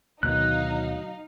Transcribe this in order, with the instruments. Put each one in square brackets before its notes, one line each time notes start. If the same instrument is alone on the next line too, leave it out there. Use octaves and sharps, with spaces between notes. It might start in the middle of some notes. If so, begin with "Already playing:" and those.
[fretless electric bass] D2 B2 D#3 [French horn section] F#3 [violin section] D#4 F5 [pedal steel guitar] F#6